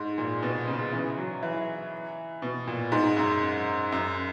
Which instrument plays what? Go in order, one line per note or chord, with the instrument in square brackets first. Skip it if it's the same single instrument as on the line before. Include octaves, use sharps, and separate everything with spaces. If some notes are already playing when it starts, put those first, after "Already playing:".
Already playing: [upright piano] G#2
A#2
B2
C#3
E3
F#3
E3
B2
A#2
G#2
F#2
F#2